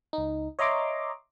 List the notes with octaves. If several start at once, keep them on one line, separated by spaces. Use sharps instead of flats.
C#2 D#4
C#5 D#5 E5 A#5 C6 D6